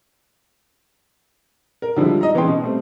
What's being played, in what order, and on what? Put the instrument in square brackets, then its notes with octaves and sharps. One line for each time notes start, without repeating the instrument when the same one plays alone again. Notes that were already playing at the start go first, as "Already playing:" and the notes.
[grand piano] A#4
D3 F3 G3 G#3 E4
D#4 D#5 A#5
E3 B3 C#4 G#4 G5 C6
B2
G3 A3 C4